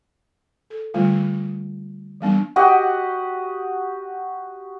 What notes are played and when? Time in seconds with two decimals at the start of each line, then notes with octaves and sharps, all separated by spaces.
0.70 A4
0.94 D3 G3 A3 F4
2.21 E3 G3 B3 D4
2.56 F#4 G4 D#5 F#5